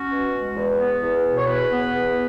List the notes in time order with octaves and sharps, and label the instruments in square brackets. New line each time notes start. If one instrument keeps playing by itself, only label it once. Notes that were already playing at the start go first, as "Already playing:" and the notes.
Already playing: [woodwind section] C#4 F#4
B2
G#3
E2
B3
E2
B2
C#5
E2 B4
B3
E2